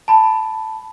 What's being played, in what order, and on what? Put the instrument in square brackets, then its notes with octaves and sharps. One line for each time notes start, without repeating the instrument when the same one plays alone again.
[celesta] A5 B5